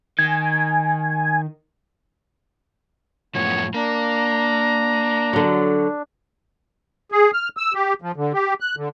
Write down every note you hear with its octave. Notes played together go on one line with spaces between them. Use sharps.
D#3 G#5
F#2 A2 F3 B3 C#5
A#3 D4 A#5
D3 F#3
G#4
F6
E6
G4
F3
D3
G4
F#6
D3